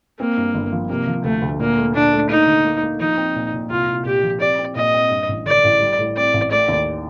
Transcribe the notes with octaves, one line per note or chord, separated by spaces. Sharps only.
A#3 C4
G2
G1
F3
C3 A#3
F3
D2 A3
D2
A#2 A#3
A3
A#2 D4
A3
A#3 D#4
D3
A#3
A#3
F3 D#4
C4
A#2
A#2
C2 F4
C2
A#2 G4
F3
C4 D5
C4
A#2 D#5
C4
G2
A1
D3 D5
A1
G3
A2
C4 D5
A1
A3 D5
D#2